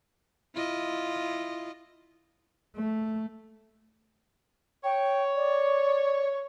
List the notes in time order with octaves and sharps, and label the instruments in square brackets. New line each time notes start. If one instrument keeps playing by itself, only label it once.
[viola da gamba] E4 F4 D#5
[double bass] A3
[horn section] C#5 [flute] G5
[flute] D5